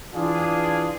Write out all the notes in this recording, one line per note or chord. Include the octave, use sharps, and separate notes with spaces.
E3 D4 F4 G#4